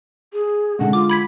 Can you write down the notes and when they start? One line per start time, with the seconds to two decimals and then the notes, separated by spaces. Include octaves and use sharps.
0.33 G#4
0.79 D3 G#3 F#5
0.93 F4 D6
1.09 B5 G#6 B6